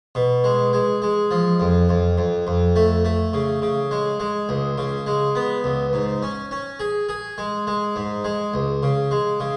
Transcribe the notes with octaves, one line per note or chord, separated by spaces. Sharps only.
B2
G#3
G#3
G#3
F3
F2
F2
F2
F2
A3
A3
C#3
C#3
G#3
G#3
C#2
C#3
G#3
B3
C#2
G#2
C#4
C#4
G#4
G#4
G#3
G#3
G#2
G#3
C#2
C#3
G#3
C#3